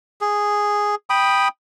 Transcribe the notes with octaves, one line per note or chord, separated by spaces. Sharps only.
G#4
G5 B5 D#6